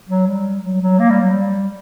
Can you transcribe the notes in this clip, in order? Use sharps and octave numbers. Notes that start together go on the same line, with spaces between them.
F#3
G3
F#3
F#3
A#3
G3
F#3
G3